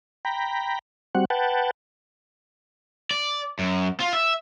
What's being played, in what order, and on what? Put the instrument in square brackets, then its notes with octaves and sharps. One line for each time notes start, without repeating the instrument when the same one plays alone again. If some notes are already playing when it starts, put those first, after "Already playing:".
[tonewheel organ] G5 A#5 B5
G3 C4 F#4 F#5
B4 F#5 G5 A5
[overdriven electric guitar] D5
F#2
F4
E5